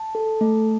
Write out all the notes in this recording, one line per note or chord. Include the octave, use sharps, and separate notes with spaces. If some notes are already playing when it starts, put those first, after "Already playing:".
Already playing: A5
A4
A3